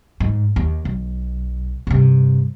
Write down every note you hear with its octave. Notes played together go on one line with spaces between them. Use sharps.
G#2
D#2
B1
G2 C3